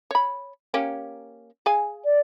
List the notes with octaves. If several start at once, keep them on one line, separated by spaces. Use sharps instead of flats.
C#5 B5
A#3 C#4 G4
G#4 F5 G#5
D5